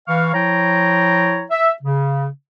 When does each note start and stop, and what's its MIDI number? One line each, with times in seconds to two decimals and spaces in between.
0.08 0.33 52
0.08 0.33 77
0.08 0.33 85
0.34 1.44 53
0.34 1.44 64
0.34 1.44 73
0.34 1.44 79
0.34 1.44 82
1.50 1.71 76
1.82 2.26 49